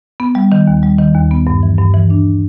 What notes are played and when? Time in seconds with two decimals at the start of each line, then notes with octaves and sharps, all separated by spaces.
0.20 B3
0.35 G3
0.52 D#3
0.68 D#2
0.83 G3
0.99 D#3
1.15 D#2
1.31 B3
1.47 G2
1.63 E3
1.78 G2
1.94 E3
2.10 D4